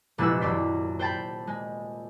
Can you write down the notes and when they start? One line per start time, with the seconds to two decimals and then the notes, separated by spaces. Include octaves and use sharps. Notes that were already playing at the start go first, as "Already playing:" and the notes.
0.18 F1 A#1 G#3 E4 B4 E6
0.41 D#1 F#2 D5 C6 B6
0.99 C5 G5 A5 B5
1.47 G#3